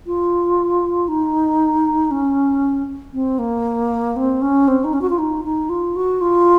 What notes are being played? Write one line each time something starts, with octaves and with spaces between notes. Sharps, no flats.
F4
D#4
C#4
C4
A#3
C4
C#4
C4
D#4
C#4
F#4
F4
D#4
D#4
F4
F#4
F4